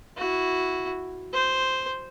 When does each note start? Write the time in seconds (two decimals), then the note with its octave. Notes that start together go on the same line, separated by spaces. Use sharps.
0.17 E4 F#4
1.34 C5